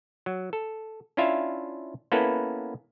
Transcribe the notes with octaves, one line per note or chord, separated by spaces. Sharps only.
F#3
A4
C#4 D4 E4 F4 E5 F5
A#3 B3 C#4 E4 A4 B4